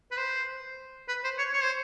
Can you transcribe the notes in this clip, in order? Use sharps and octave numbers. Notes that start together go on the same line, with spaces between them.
B4
C5
B4
C5
C#5
C#5
C5